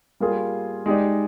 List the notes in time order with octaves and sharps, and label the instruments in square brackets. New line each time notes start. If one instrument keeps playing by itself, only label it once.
[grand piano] G3 A#3 F4 G#4
G#3 D#4 G4 D5